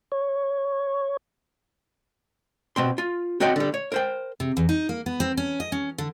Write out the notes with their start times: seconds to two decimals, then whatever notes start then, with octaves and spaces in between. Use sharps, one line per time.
0.12 C#5
2.76 B2 C4 C6
2.98 F4
3.40 C4 F#4 C#5 D#5 G5
3.56 D3 G3
3.74 C#5
3.92 A#4 C5 G5
4.40 C3
4.57 E2
4.69 D#4
4.89 A#3
5.06 B3
5.20 C4
5.37 C#4
5.60 D#5
5.72 C#4
5.98 D3